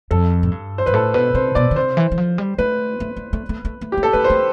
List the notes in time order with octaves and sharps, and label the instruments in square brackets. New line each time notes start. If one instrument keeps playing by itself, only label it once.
[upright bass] F2 [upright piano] A4
[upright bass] A2
G2
[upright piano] C5
[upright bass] G2 [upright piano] B4
[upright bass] A2 [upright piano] A4
[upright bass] B2 [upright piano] B4
[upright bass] C3 [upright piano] C5
[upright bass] B2 [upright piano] D5
[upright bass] D3
[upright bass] C3 [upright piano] C5
[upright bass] E3
E3
F3
G3
[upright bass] A3 [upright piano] B4
[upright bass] A3
A3
A3
A3
A3
A3
[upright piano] G4
[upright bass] A3
[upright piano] A4
[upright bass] A3 [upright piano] B4
[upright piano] C5
[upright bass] A3